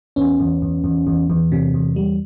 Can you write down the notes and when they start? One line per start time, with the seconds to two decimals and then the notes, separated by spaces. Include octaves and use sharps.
0.16 E2 B3 C#4
0.40 E2
0.62 E2
0.84 E2
1.07 E2
1.30 E2
1.52 C3
1.74 E2
1.96 G3